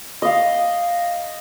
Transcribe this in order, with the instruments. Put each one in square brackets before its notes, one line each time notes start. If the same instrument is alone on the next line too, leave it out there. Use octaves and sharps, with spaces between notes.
[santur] D#5 F5